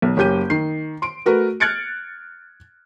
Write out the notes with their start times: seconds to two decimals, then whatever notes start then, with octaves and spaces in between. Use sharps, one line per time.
0.02 B1
0.17 F#1 C#4 G4 G6 D#7
0.50 D#3 C7
1.02 C6 D7
1.26 A3 F#4 A#4 B4
1.60 F6 F#6 G#6 A6 C#7 D7